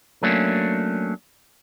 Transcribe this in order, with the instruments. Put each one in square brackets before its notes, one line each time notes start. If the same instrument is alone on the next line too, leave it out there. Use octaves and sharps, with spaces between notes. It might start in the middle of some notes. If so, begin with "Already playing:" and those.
[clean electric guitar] F#3 A3 A#3 C#4 D4